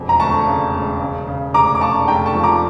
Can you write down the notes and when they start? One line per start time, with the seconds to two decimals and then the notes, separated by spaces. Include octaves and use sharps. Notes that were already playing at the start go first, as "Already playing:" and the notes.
Already playing: E1 F2
0.09 A#5
0.20 D2 A5 C#6
0.48 C#3
0.74 E1
1.00 C#3
1.27 C#3
1.54 F1 A#5 D6
1.75 D6
1.81 C#3 A5 C#6
2.08 F1 G5 A#5
2.26 A5 C#6
2.35 F3
2.44 A#5 D6